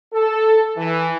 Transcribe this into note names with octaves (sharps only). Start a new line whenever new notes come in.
A4
E3